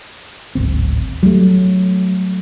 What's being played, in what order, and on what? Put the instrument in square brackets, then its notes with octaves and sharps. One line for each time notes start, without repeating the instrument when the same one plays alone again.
[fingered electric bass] D1 G#1 C4
[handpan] F#3 A3 [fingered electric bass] G3